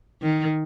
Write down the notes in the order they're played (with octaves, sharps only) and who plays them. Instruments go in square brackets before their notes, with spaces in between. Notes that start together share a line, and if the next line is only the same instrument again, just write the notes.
[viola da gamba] D#3